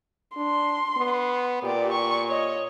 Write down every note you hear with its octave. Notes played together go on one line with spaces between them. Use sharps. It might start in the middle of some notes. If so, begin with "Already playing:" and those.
D4 C6
B3
A#2 G4 D5
C#6
C#5 D#5